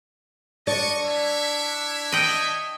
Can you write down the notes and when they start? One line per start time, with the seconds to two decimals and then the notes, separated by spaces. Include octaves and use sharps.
0.67 D4 D5 D#5 C#6
1.05 E4 C#5 E5
2.12 D#5 G5